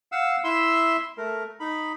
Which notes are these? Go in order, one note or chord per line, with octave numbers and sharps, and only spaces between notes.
F5 F#5 E6
E4 E5 C6 E6
A3 A#4
D#4 B5